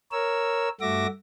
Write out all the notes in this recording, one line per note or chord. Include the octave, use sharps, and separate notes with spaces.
A#4 C#5 E6
G2 A3 F#4 E5 D6 A#6